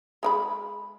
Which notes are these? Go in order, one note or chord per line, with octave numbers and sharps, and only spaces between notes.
G#3 G5 B5